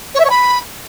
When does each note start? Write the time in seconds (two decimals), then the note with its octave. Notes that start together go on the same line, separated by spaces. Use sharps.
0.15 C#5
0.20 E5
0.25 C#5
0.30 B5